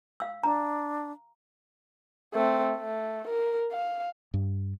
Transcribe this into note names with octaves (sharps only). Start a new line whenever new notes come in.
F5 E6
D4 A#5
A3 C4
A3
A#4
F5
G2